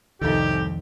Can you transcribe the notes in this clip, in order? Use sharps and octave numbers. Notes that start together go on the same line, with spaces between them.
C2 F2 A2 D#3 D#4 G4 A4